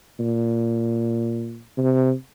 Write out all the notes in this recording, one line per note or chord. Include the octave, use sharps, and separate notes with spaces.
A#2
C3